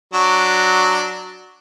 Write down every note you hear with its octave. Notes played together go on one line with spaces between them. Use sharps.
F#3 D4